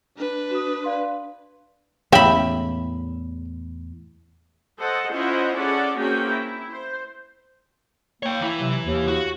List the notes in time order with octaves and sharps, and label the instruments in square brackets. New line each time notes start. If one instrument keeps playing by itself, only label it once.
[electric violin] D4 B4
[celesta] F#4 D#6
D5 F5 C6
[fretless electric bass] E2 A2 [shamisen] C#3 F5 G5 [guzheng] E5 B5
[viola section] A4 C5 D#5 F#5
C#4 E4 F4 C5 D#5 F#5
C#4 G#4 A4 D5 F#5
A#3 C4 C#4 F#4 G#4 G5
E4
C5
[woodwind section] A#3 [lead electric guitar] C#5 G5
[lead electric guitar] E3 E4
[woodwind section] C3 F#3
D#2
[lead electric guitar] F#4